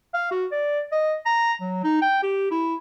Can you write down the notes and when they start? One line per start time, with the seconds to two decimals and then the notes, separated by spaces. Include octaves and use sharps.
0.14 F5
0.31 F#4
0.52 D5
0.92 D#5
1.26 A#5
1.61 F#3
1.84 D#4
2.02 G5
2.23 G4
2.51 E4